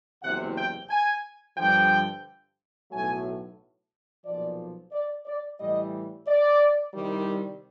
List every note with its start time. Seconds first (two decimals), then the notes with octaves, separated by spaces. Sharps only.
0.22 F#1 E2 C3 F#5
0.56 G5
0.90 G#5
1.57 G2 D3 F3 G5
2.91 B1 A2 F#3 A3 G#5
4.25 B1 A#2 F3 D5
4.92 D5
5.26 D5
5.59 A2 E3 G3 D#5
6.27 D5
6.93 C2 C3 D#3 G3